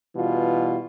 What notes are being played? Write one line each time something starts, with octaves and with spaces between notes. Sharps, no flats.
B2 E3 G3 F4